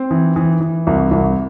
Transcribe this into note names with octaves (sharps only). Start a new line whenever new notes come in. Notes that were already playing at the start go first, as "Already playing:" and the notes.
Already playing: C4
E3
E3
E3
C2
C2